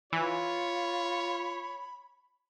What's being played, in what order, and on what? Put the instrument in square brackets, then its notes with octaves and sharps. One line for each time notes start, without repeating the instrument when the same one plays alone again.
[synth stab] E3 [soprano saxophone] F4 [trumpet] C#5 [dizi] B5